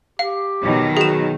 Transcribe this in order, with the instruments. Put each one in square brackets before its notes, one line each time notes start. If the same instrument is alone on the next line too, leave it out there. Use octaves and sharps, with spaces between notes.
[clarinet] G4 [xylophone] F5
[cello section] B2 D#3 F#3
[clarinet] F#4 [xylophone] G#4 E7